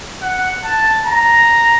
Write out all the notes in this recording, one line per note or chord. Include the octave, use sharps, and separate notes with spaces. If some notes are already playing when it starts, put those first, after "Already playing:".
F#5
A5
A#5